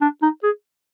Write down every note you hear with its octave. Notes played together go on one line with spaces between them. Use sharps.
D4
D#4
G#4